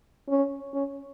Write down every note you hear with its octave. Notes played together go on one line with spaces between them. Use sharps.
C#4
C#4